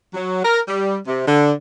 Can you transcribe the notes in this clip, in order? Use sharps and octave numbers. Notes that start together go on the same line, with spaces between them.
F#3
A#4
G3
C3
D3